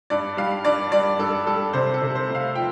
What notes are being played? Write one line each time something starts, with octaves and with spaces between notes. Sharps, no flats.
G2 D5
G3 F5
G2 D5
G3 D5
G2 A4
G3 A4
C3 C5
A4
C3
C5
A3
F5
F3 G5